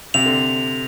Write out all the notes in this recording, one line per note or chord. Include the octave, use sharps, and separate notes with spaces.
C3 F7
D3